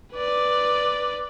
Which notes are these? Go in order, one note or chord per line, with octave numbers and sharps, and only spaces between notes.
B4 D5